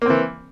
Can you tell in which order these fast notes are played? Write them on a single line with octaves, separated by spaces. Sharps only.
A#3 C4 E3